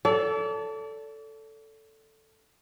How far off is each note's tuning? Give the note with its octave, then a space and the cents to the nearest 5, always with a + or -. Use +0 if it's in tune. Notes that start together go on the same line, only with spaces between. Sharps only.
A4 +5 D5 -35